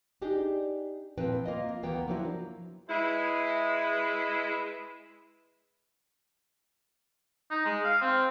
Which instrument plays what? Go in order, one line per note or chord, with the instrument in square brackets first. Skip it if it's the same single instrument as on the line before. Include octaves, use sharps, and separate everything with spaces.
[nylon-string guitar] D4 D#4 G4 G#4
A#2 F3 C4 E4 B4 G5
A#3 F4 D#5
D2 E3 A#3 B3 G5
F3 F#3 A#3 D4 E4 A#4
[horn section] G#3 E4 B4
[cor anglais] D#4
G#3
F5
C4